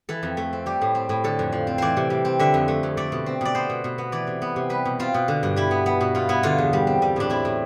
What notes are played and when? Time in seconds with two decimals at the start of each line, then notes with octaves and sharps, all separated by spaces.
0.09 E3 A4
0.23 F2
0.37 A3
0.53 C4
0.66 G3 G4
0.81 A2
0.95 C4
1.09 A2
1.24 D3 A4
1.39 F2
1.52 F3
1.67 C4
1.78 E3 C5 D5
1.97 C3
2.10 G3
2.25 C4
2.39 D3 E5
2.54 F2
2.68 A3
2.83 F2
2.97 A3 D5
3.12 B2
3.26 C4
3.41 B2 D5
3.55 B3 C5
3.69 B2
3.84 B2
3.98 B3
4.12 E3 D5
4.27 C3
4.42 B3
4.56 C3
4.70 G3 B4
4.85 B2
4.99 C4 F4
5.14 B2
5.28 D3
5.43 G2
5.56 G3 E4
5.71 B3
5.86 B3
6.01 B2
6.15 B2 F4
6.29 B3 E4
6.43 D3 F4
6.58 E2
6.73 G3
6.87 C4
7.02 G3
7.16 A2 D4
7.30 C4 E4
7.45 A2